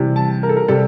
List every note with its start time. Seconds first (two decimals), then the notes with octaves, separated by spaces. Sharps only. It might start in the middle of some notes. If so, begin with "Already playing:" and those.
Already playing: C3 E3 G3
0.16 A5
0.43 A#4
0.49 A4
0.57 A#4
0.68 C3 G3 A4